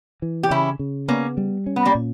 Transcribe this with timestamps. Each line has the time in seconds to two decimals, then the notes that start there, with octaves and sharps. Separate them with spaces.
0.22 E3
0.43 G4
0.50 C#3 C#4 E4
0.79 C#3
1.08 A#3 B3 C#4
1.37 G3
1.66 C#4
1.76 B3
1.85 G3 A#3
1.95 A#2